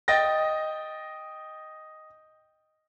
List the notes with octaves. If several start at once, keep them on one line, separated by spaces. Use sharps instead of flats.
D#5 G5 A6 A#6